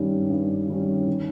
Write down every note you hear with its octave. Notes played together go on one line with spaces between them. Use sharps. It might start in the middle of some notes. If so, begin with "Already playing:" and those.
Already playing: G2 D#3 G3 C#4
G2
D#3 G3 C#4
D#3